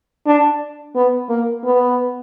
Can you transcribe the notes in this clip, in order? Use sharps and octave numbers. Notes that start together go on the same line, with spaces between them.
D4
B3
A#3
B3